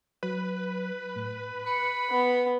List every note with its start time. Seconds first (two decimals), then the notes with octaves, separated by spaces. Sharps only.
0.23 F#3 B4
1.15 A2
1.66 B5 C#7
2.11 B3